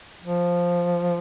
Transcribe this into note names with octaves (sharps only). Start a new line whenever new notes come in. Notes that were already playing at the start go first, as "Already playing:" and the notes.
F3